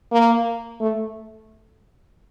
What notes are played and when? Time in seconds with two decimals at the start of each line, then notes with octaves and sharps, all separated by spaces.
0.12 A#3
0.81 A3